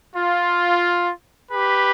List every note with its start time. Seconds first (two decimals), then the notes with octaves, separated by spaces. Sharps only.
0.14 F4
1.50 G4 B4